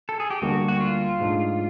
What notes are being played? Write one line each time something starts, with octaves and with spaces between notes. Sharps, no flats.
A4
G#4
G4
D2 D3 G3 A#3 D4 F#4
F#4
F4
G#2 F3 A3 D4